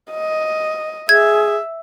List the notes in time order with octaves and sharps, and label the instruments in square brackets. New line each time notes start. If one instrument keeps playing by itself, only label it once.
[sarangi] D#5
[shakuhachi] G#4 [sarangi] E5 [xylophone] G#6